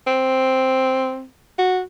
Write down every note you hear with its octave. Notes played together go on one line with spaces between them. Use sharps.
C4
F#4